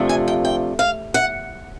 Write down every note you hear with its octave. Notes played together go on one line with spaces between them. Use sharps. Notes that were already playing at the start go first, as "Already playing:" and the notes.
Already playing: C3 F3 A3 D4 F4
G#5
G5
G5
F5
F#5